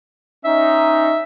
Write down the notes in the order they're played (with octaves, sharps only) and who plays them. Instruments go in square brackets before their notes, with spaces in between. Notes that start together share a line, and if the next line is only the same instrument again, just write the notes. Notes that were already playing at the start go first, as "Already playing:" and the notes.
[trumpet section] C#4 D#4 [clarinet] E5